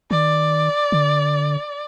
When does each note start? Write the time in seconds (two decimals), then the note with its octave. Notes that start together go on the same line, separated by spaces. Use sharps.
0.11 D#3 D5
0.92 D3